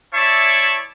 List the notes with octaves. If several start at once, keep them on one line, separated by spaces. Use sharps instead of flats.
E4 C#5 D5 E5 A5 C#6